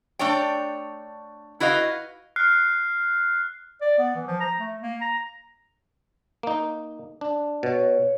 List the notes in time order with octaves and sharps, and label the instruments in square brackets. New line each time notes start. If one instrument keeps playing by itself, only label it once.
[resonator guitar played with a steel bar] A3 D4 C#5 D5 G5
E4 F#4 B4 D#5 F5
[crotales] F6 F#6 C7
[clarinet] D5
B3
E3
F3
A#5
A3
A#3
A#5
[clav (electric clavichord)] A#3 D#4
D4
[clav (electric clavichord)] B2 [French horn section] C#5